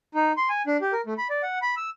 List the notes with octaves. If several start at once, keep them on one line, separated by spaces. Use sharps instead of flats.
D#4
C6
G#5
D4
G4
A#4
A3
B5
D5
F#5
B5
E6